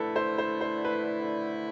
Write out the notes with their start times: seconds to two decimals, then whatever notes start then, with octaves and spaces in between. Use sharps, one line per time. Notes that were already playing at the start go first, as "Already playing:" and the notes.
Already playing: D3 A3 E4 A4 B4
0.16 C5
0.38 C5
0.61 C5
0.85 B4